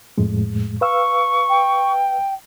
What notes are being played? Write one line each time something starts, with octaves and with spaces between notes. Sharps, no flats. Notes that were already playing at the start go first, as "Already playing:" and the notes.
F2 A2 G#3
B4 F5 C#6 E6
G5